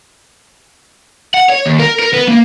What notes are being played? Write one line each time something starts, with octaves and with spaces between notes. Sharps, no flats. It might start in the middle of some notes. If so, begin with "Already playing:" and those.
F#5
C#5
D#2
A#4
A#4
B3
A#3